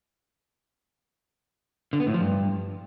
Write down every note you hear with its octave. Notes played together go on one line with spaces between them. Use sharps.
D3
B3
A2
F3
G2